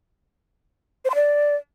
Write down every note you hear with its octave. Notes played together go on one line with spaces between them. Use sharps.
C5
C6
D5